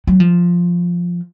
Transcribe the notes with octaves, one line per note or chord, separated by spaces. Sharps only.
F#3
F3